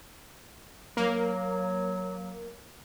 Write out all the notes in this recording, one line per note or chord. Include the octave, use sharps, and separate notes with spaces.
F#3 A#3